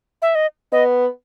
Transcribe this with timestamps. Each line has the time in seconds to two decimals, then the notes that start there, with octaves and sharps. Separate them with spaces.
0.22 E5
0.35 D#5
0.72 B3 D#5